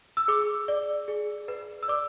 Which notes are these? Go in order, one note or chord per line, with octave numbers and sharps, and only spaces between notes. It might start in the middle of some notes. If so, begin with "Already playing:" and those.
E6
G#4 D6
D5
G#4
B4
E6
D5 D6